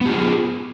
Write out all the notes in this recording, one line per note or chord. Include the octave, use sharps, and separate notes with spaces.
B3 F4 G4 G#4